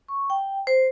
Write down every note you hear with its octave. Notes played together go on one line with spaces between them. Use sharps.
C#6
G5
C5